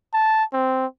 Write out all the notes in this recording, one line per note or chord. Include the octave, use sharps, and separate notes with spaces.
A5
C4